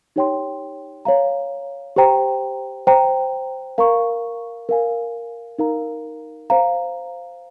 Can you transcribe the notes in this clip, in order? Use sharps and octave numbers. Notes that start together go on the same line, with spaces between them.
D#4 G4 C#5 G5 C6
C#5 F5 A#5
G4 C5 G5 A#5
C5 G5 A#5
A#4 F5 A#5 C#6
A#4 F5 G#5
D#4 A#4 F5 A#5
C5 F5 A#5